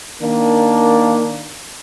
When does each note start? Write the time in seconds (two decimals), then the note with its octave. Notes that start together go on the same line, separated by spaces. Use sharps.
0.21 D#3 A#3 D4